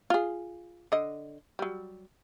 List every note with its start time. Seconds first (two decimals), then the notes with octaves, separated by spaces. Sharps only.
0.10 F4 G#4
0.92 D3 D#5
1.59 F#3 G3